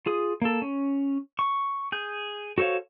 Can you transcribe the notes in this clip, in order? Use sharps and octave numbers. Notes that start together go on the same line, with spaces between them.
F4 G#4 D#6
A#3 A4
C#4
C#6
G#4 G6
F#4 A4 C5 C#5 F5